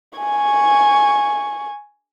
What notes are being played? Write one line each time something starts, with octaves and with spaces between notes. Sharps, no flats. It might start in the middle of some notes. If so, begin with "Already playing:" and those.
G#5 C#6